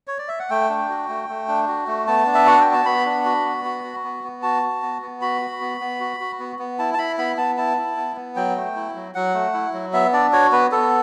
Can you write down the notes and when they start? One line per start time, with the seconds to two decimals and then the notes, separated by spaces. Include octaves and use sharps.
0.07 C#5
0.18 D5
0.28 E5
0.40 F#5
0.50 A3 G5
0.70 D4
0.89 F#4
1.09 A3
1.29 A3
1.48 D4
1.68 F#4
1.87 A3
2.07 B3 A5
2.26 D4
2.35 E5
2.46 F#4 F#5
2.61 G5
2.66 B3
2.73 A5
2.86 B3 B5
3.06 D4
3.25 F#4
3.45 B3
3.65 F#4
3.84 F#4
4.04 B3
4.24 B3
4.43 F#4 A5
4.62 F#4
4.82 B3
5.02 B3
5.21 F#4 B5
5.42 F#4
5.61 B3
5.81 B3
6.00 F#4
6.20 F#4
6.40 B3
6.59 B3
6.79 E4 A5
6.94 A5
6.98 E4 B5
7.18 B3 B5
7.38 B3 A5
7.57 E4 A5
7.77 E4
7.97 B3
8.16 B3
8.36 F#3 G5
8.56 A3
8.76 E4
8.95 F#3
9.15 F#3 F#5
9.34 A3
9.54 E4
9.73 F#3
9.93 B3 E5
10.13 D4 D5
10.33 F#4 C#5
10.52 B3 B4
10.72 B3 A4